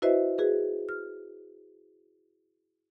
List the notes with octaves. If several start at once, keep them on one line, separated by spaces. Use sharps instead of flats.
E4 F#4 B4 C5 D#5 E5
F#4 G#4 B4
F6